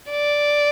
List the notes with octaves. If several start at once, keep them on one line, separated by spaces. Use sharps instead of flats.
D5